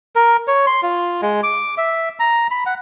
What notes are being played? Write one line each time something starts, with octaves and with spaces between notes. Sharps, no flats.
A#4
C#5
C6
F4
G#3
D6
E5
A#5
B5
F#5